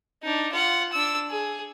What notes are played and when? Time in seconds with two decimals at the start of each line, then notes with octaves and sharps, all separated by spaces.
0.23 D4 D#4
0.52 F4 F#5
0.92 D4 E6
1.30 G#4